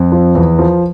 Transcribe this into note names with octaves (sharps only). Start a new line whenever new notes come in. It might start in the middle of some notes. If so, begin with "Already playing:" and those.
Already playing: F2
F3
E2
F3